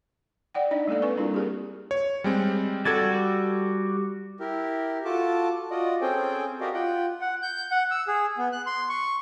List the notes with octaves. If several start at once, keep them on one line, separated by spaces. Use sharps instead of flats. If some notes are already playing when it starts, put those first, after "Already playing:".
D5 F#5 G5
D4 D#4 D5 D#5
G#3 A#3 B3 A4 D5
C4 A4 B4 C#6
G3 A#3 D4 E4 F4 A#4
G4 G#4 A#4
C#5
G3 G#3 C4
G3 F#4 A4 G#6 A6
E4 G4 A#4
F4 F#4 A4 A5 D6
F4 F#4 D5 D#5
C4 C#4 G#4 A4 C5 G5
F#4 G4 A#4 D5 D#5 F5
F4 F#5 G5
F#5
G6
F#5
E6
G#4
B3
F#6
C6
C#6